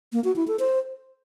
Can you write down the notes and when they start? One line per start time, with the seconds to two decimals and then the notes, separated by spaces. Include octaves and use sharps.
0.13 A#3
0.24 F#4
0.36 E4
0.48 A4
0.59 C5